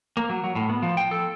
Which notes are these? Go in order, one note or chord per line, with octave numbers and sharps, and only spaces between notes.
A#3
F#3
F#3
A2
B3
F3
G5
A4